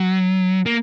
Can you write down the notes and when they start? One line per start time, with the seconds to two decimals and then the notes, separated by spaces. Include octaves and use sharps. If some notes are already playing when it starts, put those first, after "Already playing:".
Already playing: F#3
0.66 A#3